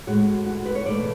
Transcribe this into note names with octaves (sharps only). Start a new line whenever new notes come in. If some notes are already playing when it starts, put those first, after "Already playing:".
A2 G#3 F#4
F#4
B4
C#5
E2 B2 A3 D5